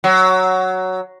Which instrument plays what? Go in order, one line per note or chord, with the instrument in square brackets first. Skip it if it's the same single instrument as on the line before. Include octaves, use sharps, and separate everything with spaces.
[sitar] F#3